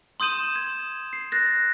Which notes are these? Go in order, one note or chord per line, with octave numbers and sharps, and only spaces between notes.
C6 D#6 G6 D#7 E7
G#6
C7
F#6 A6 A#6